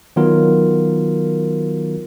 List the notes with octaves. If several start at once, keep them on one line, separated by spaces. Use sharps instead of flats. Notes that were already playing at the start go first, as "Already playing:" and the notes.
D#3 F#3 B3 F4 A#4